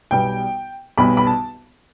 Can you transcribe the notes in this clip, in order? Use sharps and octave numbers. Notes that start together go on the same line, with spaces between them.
B1 B2 G3 G5
B1 B2 G3 B5
B5
A5